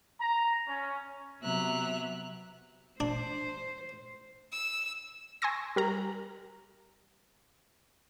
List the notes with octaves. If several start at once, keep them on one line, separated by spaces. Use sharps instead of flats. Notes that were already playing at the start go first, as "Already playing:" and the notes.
A#5
C#4
C3 F#3 B3 E5 A#5 F#6
D4 C5
E6
G#5 C6 C#6 E6 A#6
G3 A#4 A#5